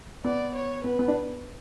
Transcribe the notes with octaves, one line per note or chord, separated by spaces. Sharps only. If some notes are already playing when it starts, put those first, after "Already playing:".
B3 D5
C#5
B3 B4
B3
D4